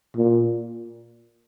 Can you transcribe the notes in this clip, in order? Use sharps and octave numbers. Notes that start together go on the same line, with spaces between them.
A#2